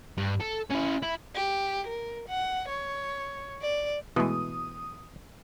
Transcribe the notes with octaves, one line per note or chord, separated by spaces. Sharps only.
G2
A4
C#4 E4
E4
G4
A#4
F#5
C#5
D5
B2 E3 G#3 A3 B3 D#6